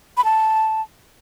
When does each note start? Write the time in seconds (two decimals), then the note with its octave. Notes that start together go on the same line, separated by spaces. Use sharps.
0.17 B5
0.25 A5